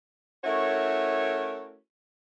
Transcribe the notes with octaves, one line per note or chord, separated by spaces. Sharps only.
A3 C#4 E4 F#4 A#4 C#5